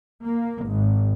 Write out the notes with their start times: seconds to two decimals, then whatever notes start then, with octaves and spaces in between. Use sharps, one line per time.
0.25 A#3
0.66 G#1